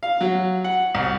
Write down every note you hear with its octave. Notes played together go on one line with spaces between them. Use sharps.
F5
F#3
F#5
C2